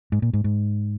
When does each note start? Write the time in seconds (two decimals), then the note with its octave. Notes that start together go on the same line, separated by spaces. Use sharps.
0.12 G#2
0.22 A#2
0.33 G#2
0.44 G#2